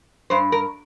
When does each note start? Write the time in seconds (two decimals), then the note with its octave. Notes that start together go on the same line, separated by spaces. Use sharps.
0.30 G2 C5
0.52 A#4